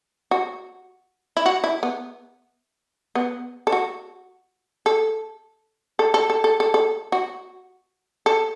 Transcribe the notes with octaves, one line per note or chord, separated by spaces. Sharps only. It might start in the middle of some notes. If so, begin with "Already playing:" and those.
F#4
E4
F#4
E4
B3
B3
A4
F#4
A4
A4
A4
A4
A4
A4
A4
F#4
A4